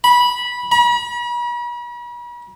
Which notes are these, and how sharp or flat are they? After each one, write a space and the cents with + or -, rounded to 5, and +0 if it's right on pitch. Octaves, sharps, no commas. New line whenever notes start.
B5 -15
B5 -45